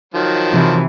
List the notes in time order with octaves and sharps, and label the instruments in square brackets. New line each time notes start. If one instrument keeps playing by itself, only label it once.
[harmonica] D#3 F3 F#3
[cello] C3 E3